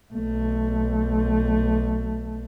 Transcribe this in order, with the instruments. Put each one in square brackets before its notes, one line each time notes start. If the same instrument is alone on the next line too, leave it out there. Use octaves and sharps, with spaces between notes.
[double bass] B1 A3